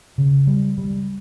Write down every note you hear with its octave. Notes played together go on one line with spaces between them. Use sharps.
C#3
G3
G3